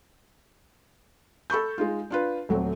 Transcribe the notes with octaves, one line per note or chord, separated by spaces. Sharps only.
A4 B5 C#6 G6
G#3 D#4 F4
D4 F4 B4
D#1 F#3 A3 C4